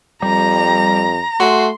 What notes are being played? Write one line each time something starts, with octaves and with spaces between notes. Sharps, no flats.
F2 G3 A#5
A3 F#4 C6